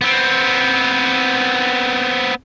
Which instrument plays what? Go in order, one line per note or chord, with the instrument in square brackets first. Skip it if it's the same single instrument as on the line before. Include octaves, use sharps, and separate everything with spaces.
[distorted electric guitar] B3 C4